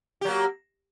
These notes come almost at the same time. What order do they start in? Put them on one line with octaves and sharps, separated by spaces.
G4 F#3 A#3